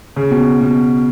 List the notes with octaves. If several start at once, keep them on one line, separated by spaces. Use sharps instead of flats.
C#3
B2
B2